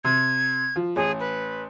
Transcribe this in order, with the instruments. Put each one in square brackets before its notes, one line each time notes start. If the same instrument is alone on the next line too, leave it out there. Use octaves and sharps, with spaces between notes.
[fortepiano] C3 [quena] G#6
[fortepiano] F3
[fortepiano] A1 [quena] G#4
[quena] B4